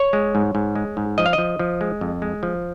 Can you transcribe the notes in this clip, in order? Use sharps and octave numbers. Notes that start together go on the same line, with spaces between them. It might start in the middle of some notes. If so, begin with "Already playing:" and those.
Already playing: C#5
G#3
G#2
G#2
G#3
G#2
F3 D#5
F5
D#5
F3
F3
G#3
F2
G#3
F3